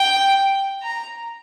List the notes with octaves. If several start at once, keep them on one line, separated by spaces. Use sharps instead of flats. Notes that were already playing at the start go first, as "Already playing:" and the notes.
Already playing: G5
A#5